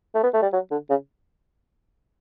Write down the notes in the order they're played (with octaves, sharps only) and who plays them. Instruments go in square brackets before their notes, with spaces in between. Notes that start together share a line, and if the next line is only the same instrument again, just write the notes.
[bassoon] A3
B3
A3
G3
F#3
D3
C#3